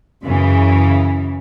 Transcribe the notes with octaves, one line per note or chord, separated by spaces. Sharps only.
F#2 C#3 E3